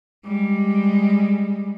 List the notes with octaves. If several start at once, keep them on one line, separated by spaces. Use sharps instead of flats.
G3 G#3